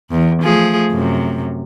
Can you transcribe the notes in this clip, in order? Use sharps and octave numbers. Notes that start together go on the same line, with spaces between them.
E2
F3 A3 G#4
F#2 C3